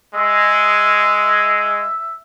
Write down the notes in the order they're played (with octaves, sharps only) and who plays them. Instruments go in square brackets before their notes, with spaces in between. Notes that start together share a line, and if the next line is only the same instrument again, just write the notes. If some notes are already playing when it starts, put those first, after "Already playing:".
[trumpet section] G#3 [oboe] E5